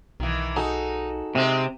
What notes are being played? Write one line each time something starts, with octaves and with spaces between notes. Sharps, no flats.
B1 D#3 E3
D#4 F#4 G#4 A4
C3 G#3 C4 G4